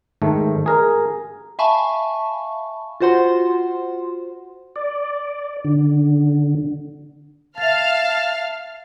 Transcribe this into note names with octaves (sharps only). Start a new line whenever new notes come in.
G#2 D#3 A3
G#4 A#4
E5 F5 G#5 A5 B5 C#6
F4 F#4 C5 F#5 C6
D5
D3
E5 F5 A5 F6 A6